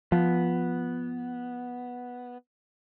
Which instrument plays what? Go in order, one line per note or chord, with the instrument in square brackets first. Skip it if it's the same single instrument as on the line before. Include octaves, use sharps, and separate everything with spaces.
[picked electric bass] F3 [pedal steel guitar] B3